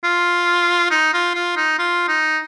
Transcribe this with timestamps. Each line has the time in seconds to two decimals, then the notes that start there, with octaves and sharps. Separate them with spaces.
0.04 F4
0.90 D#4
1.13 F4
1.35 F4
1.57 D#4
1.79 F4
2.08 D#4